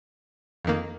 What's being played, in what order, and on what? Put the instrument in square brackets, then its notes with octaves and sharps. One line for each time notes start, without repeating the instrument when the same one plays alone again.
[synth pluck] F2 D#3 A#3